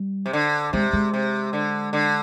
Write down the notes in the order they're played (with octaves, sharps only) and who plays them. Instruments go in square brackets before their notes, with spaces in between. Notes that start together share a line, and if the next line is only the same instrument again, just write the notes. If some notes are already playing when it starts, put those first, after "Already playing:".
Already playing: [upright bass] G3
[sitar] C3
D3
[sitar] C3 [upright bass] G#3
[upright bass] G#3
[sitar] C3
D3
D3